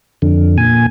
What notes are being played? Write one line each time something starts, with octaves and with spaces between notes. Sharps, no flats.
F2 D3
A#2 G#5